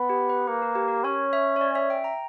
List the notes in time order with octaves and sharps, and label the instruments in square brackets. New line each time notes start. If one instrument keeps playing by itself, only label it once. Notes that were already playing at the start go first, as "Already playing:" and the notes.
Already playing: [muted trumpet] B3
[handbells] G4
B4
[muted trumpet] A#3 [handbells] B4
[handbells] A#4
G4
A#4
[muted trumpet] C#4 [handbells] C#5
[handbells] E5
C#5
D5
E5
G5
A#5